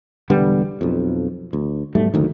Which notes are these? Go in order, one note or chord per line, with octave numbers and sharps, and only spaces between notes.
E1 D3 G3 B3
B1 F2
D2
B1 G#2 G3 A3
F#1 D2 D#3